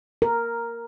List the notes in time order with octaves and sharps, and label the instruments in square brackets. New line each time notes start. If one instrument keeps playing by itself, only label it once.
[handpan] A#4